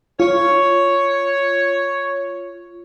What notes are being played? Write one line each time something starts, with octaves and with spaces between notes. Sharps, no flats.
F4 C#5